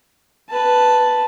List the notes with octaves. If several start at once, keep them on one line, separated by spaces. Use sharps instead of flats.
B4 A5